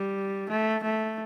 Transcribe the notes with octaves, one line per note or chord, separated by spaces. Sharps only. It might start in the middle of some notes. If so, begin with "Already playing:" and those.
Already playing: G3
A3
A3